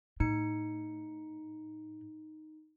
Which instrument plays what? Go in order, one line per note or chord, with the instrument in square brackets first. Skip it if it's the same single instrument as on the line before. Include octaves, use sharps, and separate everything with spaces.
[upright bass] A2 [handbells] D#4 C#7